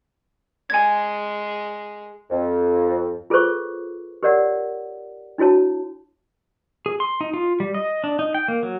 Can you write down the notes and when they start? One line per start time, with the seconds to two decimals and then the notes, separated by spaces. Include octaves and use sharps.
0.70 G#3 G#4 G#5 G#6
2.30 F2
3.30 F4 G#4 A4 B4 C5 C#6
4.23 G4 A#4 C#5 D5 F#5
5.38 D4 E4 F#4 C#5 A5
6.86 G#4
7.00 C6
7.21 D#4
7.34 F4
7.60 G3
7.74 D#5
8.04 D4
8.19 D#4
8.34 G5
8.48 A#3
8.63 F#3